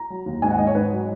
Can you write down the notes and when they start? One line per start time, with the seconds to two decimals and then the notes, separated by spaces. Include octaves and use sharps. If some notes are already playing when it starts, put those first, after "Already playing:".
Already playing: A#5
0.10 F#3
0.26 D#2
0.42 G#2 G#5
0.50 F#5
0.58 G#2 D#5
0.67 C#5
0.75 G#2 B4
0.91 F#3